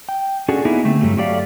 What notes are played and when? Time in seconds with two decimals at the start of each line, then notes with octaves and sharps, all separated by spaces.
0.09 G5
0.48 C#4 D4 F#4 G#4 A4
0.65 A#3 B3 D#4 E4 G#4
0.84 D3 A3 C4
1.01 G2 F#3 G3 A3
1.17 F#3 A3 G4 D5 F5